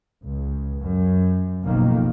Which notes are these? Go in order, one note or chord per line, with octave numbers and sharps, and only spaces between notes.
C#2
F#2
F#1 B1 F2 D#3 A#3